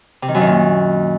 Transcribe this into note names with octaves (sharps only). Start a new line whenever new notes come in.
C3
D#3
F#2
D#3
A#2